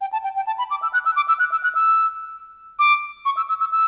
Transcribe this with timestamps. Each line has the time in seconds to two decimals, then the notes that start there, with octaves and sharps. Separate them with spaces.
0.01 G5
0.13 A5
0.24 G5
0.36 G5
0.47 A5
0.58 B5
0.71 D6
0.82 E6
0.93 F#6
1.06 E6
1.16 D6
1.28 E6
1.40 F#6
1.52 E6
1.63 F#6
1.75 E6
2.79 D6
3.25 C#6
3.37 E6
3.49 E6
3.60 E6
3.72 E6